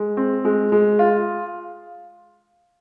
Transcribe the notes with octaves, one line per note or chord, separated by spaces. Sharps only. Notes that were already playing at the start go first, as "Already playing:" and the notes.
Already playing: G#3
C4
G#3
G#3
F4